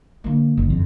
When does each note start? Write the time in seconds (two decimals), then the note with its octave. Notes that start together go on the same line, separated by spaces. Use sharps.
0.24 D3 A#3
0.57 F#1 D3
0.70 F2